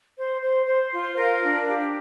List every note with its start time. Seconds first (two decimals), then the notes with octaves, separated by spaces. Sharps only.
0.17 C5
0.42 C5
0.67 C5
0.93 F4
1.18 A#4 F5
1.43 D4
1.68 G4